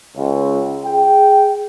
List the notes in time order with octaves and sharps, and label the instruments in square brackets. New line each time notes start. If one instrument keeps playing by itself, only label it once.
[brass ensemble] C#2
G#4 G5